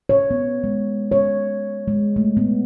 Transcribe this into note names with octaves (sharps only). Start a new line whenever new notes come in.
C#5
B3
G#3
C#5
G#3
A3
B3